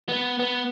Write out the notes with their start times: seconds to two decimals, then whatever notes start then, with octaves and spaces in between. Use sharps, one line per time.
0.09 B3
0.39 B3